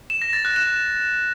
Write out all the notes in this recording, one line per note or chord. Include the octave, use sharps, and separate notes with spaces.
E7
A#6
A6
F#6
E7